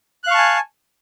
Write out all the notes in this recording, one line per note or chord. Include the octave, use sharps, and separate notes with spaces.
F5 G#5 A5 C#6 F#6